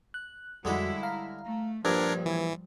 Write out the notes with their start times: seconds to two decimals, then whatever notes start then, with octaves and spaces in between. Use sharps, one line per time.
0.14 F#6
0.65 F2 D3 G3 G#3 E4 F#4 A4
1.03 F5 A#5
1.45 A3
1.85 A#1 G2 F3 G3 D4 A#4 G#6
2.26 E3